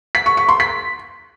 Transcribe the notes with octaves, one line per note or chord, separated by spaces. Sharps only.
B6
C#6
C#6
C6
B6